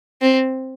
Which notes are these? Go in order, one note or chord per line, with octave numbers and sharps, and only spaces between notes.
C4